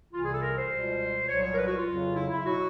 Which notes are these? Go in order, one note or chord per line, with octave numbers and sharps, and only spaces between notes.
C2 C3 E3 F4
G#4
A4
A#4
C5
C#2 B2 G3
C2 A#2 F#3 C#5
C#5
A#4
B4
F#4
F4
F2 C#3 F#3
E4
E4
B2 F#3 F#4